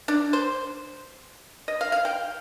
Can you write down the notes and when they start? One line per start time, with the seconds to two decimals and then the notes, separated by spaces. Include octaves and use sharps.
0.08 D4
0.33 C5
1.68 D#5
1.81 F5
1.92 F5
2.05 G5